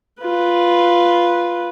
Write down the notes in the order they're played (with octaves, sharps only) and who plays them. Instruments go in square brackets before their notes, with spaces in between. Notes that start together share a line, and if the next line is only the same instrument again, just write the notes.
[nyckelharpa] F4 B4